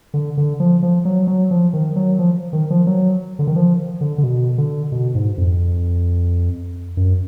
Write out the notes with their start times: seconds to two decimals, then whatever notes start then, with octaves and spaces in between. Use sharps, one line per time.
0.14 D3
0.37 D3
0.60 F3
0.83 F3
1.05 F#3
1.27 F#3
1.51 F3
1.73 D#3
1.96 F#3
2.19 F3
2.53 D#3
2.70 F3
2.87 F#3
3.39 D3
3.47 D#3
3.56 F3
4.01 D3
4.18 D3
4.23 B2
4.58 D3
4.92 B2
5.15 G#2
5.38 F2
6.97 F#2